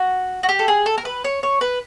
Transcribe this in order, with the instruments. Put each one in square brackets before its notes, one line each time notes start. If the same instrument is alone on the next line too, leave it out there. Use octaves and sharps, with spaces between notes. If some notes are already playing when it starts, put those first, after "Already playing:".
Already playing: [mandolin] F#4
F#4
G4
A4
G#4
A4
A#4
B4
C#5
C#5
B4